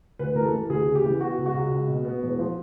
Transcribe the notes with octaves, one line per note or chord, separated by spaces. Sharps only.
D2 B4
E3 A#4
A4
E3
D2 G#4
C#3
G4
E3
B3 F#4
C#2
F#4
C#2
C#2
B2
B3
E1
F3